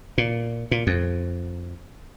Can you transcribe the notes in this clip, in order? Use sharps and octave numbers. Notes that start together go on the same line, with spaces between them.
A#2
A#2
F2